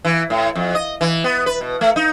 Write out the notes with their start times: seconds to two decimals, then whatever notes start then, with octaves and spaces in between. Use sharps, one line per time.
0.05 E3
0.30 A2
0.56 F2
0.75 D#5
1.01 E3
1.24 B3
1.46 B4
1.61 B2
1.81 A3
1.96 D#4